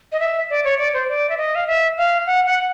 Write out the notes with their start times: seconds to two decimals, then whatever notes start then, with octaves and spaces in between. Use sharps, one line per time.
0.12 D#5
0.20 E5
0.50 D5
0.64 C#5
0.78 D5
0.94 C5
1.09 D5
1.29 E5
1.38 D#5
1.55 F5
1.67 E5
1.97 F5
2.27 F#5
2.46 F#5